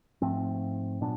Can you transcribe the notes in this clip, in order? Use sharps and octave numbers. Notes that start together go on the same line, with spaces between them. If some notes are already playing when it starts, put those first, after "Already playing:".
G#2 F3 A3 C4
A#2 F#3 B3 D4